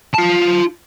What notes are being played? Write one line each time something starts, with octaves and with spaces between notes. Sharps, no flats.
F4 A5